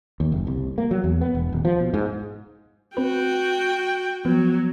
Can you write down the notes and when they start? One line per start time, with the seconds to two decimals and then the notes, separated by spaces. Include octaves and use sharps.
0.20 D#2
0.32 F#1
0.47 C2
0.78 A#3
0.91 F#3
1.04 E2
1.21 B3
1.35 E1
1.52 D#1
1.65 F3
1.80 B2
1.94 G#2
2.97 C4 F#4 B4 G5
4.25 F3 F#3 B3